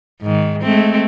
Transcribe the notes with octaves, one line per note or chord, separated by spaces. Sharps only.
G#2 D#3
G#3 A3 C4